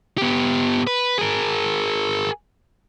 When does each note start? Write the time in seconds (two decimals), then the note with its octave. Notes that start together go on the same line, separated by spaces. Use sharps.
0.18 B3 G4
0.87 B4
1.18 G#4 A#4